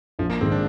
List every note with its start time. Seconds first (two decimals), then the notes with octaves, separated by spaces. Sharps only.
0.19 A#1 F3
0.30 A#3
0.41 G#2 D#3 C4
0.52 D4